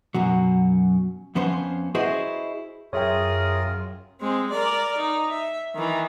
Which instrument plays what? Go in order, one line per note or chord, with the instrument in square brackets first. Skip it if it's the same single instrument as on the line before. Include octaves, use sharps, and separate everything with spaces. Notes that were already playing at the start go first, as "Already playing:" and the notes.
[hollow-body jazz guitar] F#2 B2 F#3
F2 F3 B3 C#4 C5
E4 F#4 G#4 B4 C5 D#5
[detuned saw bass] F#2 [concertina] F4 A#4 D#6 [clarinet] G#4 [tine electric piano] C#5 E5 G5
[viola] G#3 C4
A#4 D5
D#4
E5
D#3 E3